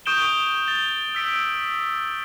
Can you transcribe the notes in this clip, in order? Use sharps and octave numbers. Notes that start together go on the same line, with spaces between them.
C#6 D#6 G6 D7 E7 G7
A6 G7
E6 B6 D7